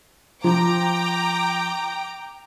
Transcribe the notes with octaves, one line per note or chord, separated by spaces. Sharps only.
F3 G5 A#5 D6